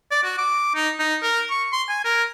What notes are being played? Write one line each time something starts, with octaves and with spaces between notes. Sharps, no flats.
D5
F#4
D6
D#4
D#4
A#4
C#6
C6
G#5
A#4